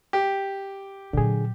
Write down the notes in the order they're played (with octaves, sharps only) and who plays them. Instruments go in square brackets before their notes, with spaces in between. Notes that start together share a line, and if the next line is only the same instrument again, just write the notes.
[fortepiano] G4
[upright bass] A#2 F#3 [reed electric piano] D3 G#4